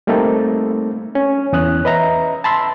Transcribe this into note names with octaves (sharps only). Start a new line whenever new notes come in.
G3 A3 A#3 C4 D#4 A4
C#4
E2 C#4 D#6 F#6
B4 D#5 E5 A#5
A5 B5 C6 E6